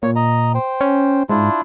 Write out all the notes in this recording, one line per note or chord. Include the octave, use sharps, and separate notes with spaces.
A#2 C#5
D#5 A#5
C5 G5
C#4
G#2 D4 E4 F4